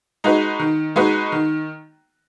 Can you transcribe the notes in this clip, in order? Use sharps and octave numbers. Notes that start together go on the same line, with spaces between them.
G#3 D#4 F#4 B4
D#3
G#3 D#4 F#4 B4
D#3